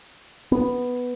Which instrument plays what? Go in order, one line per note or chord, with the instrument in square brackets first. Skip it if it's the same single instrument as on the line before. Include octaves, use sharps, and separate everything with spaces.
[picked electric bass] B3